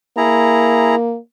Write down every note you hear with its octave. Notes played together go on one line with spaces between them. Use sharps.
A#3 E4 G#4 A#5